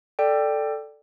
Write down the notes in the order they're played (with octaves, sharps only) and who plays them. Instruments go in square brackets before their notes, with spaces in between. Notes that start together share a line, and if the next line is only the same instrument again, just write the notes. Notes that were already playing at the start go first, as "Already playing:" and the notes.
[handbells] A4 D5 G5